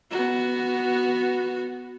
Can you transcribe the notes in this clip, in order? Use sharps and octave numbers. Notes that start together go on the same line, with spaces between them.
B3 F#4